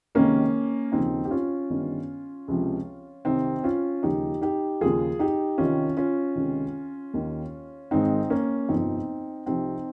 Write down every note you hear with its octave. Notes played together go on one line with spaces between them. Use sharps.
C#2 C3 D#3 A#3 C#4
D#2 C#3 F3 C4 D#4
G4
C#4 F4
G1 G2 D#3
C#2 C3 F3
C2 C3 D#3 C4 D#4
C#4 F4
D#2 C#3 F3 D#4 G4
D#4 G4
D#2 C#3 F3 F4 G#4
D#4 G4
C2 C3 D#3 C#4 F4
C#4 F4
C#2 C3 D#3
D#2 D#3
G#1 G#2 D#3 C4 D#4
A#3 C#4
G1 F2 C3 F3 C4 D#4
C2 C3 F3 C4 D#4